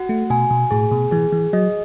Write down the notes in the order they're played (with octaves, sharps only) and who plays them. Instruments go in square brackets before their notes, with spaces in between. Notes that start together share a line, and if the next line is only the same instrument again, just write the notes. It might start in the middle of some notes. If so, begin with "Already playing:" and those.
Already playing: [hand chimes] F#4 F#5
[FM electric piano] A3
[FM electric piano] B2 [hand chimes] G#5
[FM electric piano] B2
[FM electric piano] A2 [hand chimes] G#4
[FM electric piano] B2
[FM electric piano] E3 [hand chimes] G#4
[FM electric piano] E3
[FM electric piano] F#3 [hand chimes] D#5